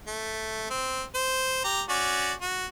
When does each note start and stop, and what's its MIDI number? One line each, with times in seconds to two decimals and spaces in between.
0.07 0.69 57
0.70 1.03 60
1.15 1.62 72
1.64 1.82 67
1.64 1.82 82
1.89 2.33 61
1.89 2.33 66
1.89 2.33 74
2.41 2.66 66